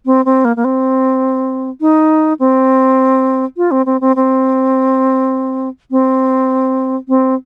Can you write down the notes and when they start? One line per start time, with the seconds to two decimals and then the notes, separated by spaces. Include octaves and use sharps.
0.06 C4
0.25 C4
0.45 A#3
0.56 A#3
0.64 C4
1.81 D#4
2.39 C4
3.57 F4
3.71 C4
3.86 C4
4.01 C4
4.16 C4
5.91 C4
7.08 C4